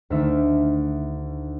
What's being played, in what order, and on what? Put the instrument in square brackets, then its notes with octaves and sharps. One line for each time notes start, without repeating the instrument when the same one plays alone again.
[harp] D2 D#3 A3 D#4 E5